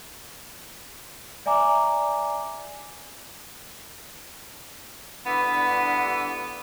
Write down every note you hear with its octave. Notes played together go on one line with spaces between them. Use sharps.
D5 E5 G#5 A#5 D6
G2 D3 E3 B3